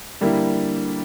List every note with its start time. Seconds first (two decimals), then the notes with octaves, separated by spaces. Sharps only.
0.21 D3 G3 A#3 E4